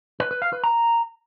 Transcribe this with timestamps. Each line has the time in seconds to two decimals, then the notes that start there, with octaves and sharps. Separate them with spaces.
0.20 B4
0.31 B4
0.42 F5
0.53 B4
0.64 A#5